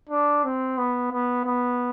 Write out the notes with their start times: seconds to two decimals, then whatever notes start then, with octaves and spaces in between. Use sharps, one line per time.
0.10 D4
0.44 C4
0.78 B3
1.11 B3
1.45 B3